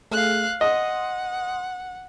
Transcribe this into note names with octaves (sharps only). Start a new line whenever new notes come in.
A3 G#4 F5 F#6
D#5 F#5 C6 D#6